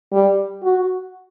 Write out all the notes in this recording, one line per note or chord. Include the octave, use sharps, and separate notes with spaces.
G3
F#4